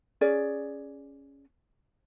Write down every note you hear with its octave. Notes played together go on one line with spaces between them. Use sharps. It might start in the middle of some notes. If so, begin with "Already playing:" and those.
C#4 G#4 D5